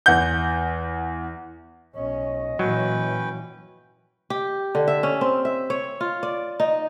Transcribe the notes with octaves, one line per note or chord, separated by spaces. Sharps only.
E2 F#5 G6
B1 C#4 D#5
A#2 E3 F#3 C#4 B4 G5
G4
D3
E5
C#4
C4
E5
C#5
F4
D5
D#4